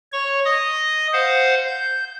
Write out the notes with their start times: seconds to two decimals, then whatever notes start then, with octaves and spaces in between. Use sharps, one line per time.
0.13 C#5 C#6
0.45 D#5 D#6
1.13 C5 F5 F#5
1.68 G6